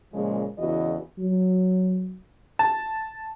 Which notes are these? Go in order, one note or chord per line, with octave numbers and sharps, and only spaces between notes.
A#2 C#3 F3 G#3
E2 C#3 E3 F#4 D#5
F#3
A5